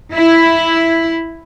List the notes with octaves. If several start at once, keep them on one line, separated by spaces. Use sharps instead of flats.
E4